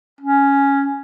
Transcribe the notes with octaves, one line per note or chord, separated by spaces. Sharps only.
C#4